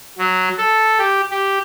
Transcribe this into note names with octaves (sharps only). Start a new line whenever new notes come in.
F#3
A4
G4
G4